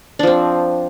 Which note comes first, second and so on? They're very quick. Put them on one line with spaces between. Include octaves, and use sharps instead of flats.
D4 F3 C4